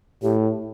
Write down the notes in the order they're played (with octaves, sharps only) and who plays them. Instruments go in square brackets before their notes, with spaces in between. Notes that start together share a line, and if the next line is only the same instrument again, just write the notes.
[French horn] A2 [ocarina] G4